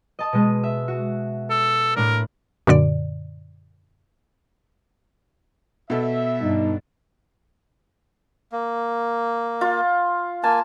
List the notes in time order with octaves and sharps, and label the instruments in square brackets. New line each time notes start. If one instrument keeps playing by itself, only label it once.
[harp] D#5 A5 D#6
B2 G#3
E5
F#4
[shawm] A4
[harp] A2 D4 [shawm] A#4
[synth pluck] F#2 A#2 D3 D5
[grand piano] B2 A4 [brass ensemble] E5
[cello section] G2 D4 [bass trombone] D#4
[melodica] A#3
[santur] F4
[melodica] A#3 G#5 [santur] A5